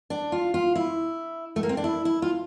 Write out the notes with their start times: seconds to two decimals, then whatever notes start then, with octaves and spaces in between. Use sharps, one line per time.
0.10 D4
0.32 F4
0.54 F4
0.76 E4
1.56 A3
1.63 A#3
1.69 C4
1.77 D4
1.84 E4
2.05 E4
2.22 F4